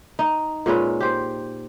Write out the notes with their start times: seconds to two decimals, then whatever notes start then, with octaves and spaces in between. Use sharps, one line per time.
0.19 D#4
0.66 A#2 G#3 C#4 B4
1.00 G4 C5